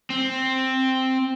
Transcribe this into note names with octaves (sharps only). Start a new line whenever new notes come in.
C4